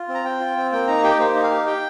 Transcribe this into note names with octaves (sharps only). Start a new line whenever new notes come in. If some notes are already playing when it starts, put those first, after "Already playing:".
Already playing: F4
C4
A#5
C4 G5
F4
C4
A#3 G5
D#4 A#5
G4 G5
A#3 C5
D#4
F5
G4
G4 G5